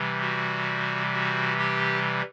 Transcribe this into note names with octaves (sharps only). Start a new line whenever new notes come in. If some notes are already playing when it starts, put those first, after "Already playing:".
Already playing: C3 E3 G3
F#4
F#4
G4